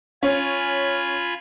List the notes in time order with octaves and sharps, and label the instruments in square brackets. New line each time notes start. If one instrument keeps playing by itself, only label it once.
[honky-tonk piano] C#4 [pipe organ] F4 G#5 B5